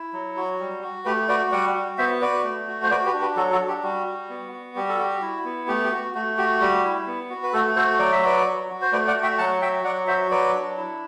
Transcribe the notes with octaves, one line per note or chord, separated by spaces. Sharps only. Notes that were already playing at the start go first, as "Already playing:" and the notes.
Already playing: E4
F#3
F#4
G3
F#4
A3 G4 B4
F#4 B4 D5
G3 D5 F#5
F#4
B3 C5 E5
F#4 B4 D5
A3
F#4
C5
F#4 B4 D5
G4 B4
D4
G4 B4
F#3 F#4 A4
F#4 A4
D4
G4
G3 F#4
F#4
B3
F#4
G3 G4
A4
F#4 G4
E4
B3
A3 G4
G4
F#4
A3 F#4
F#4 G4
G3 G4
E4
B3
F#4
B4
A3 F#4 A4
F#4 A4 C5
F#3 D5
E5
F#4 B4 D5
F#3
F#4
C5
A3 B4 D5
D5 F#5
F#4
E5 G5
F#3 F#5 A5
F#4 E5 G5
F#3 D5 F#5
F#4 C5 E5
F#3 B4 D5
D4
E4